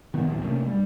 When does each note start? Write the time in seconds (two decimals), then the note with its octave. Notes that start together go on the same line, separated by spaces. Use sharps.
0.14 D#3 B3
0.27 A#1 E2 A2
0.43 C3 A3 A#3 C#4
0.67 G2 G3